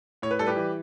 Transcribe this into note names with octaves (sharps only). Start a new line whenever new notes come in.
A2 C#5
B4
G3 A4
G4 B4
E3